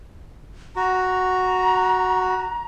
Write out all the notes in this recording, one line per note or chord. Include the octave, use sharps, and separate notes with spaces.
F#4 A#5